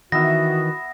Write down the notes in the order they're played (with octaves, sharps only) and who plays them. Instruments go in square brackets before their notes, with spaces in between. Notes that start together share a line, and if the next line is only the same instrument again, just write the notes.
[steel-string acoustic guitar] D#3 E3 [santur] B3 E5 [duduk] F#4 [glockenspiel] A#6